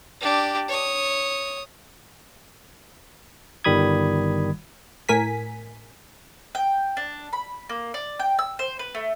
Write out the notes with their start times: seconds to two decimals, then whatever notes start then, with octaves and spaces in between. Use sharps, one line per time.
0.21 D4 G4
0.69 C#5 D#6
3.64 G1 D#3 G3 B5 D#6 G#6
5.09 A2 A#4 G#5 B6
6.55 G5
6.97 D4
7.33 B5
7.70 A#3
7.94 D5
8.19 G5
8.39 E6
8.59 C5
8.79 B4
8.95 A3